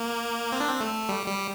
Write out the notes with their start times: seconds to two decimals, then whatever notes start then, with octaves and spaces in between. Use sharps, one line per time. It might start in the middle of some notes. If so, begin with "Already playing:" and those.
Already playing: A#3
0.52 C4
0.60 D4
0.69 C4
0.80 A3
1.09 G3
1.27 G3